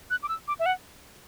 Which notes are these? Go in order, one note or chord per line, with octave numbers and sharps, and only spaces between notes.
F#6
D6
E6
D6
E5
F#5